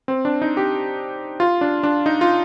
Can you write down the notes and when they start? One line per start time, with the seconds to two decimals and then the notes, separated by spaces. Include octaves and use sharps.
0.08 C4
0.25 D4
0.42 D#4
0.57 G4
1.40 F4
1.61 D4
1.83 D4
2.06 D#4
2.21 F4